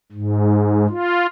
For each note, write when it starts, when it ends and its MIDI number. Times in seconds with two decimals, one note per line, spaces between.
0.12 0.87 44
0.89 1.26 65